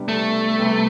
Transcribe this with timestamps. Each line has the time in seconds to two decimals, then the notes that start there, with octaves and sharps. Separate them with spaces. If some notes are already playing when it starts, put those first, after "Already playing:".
Already playing: C3 G3 B3 D4 G4
0.08 A3
0.58 C3 G3 B3